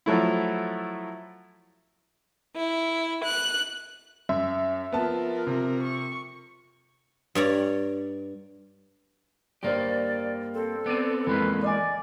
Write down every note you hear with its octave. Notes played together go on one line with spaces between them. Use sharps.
F3 F#3 A3 E4
E4
F#6
F#2 E5
F3 B3 A#4 A5
C3
C#6
G2 C#5 D5 A#5
G2 A#3 G4 C5 D5
C4 A4
B3 C4 D5 D7 D#7
F2 E3 G#3 A#3 B4
D5 D#5 G#5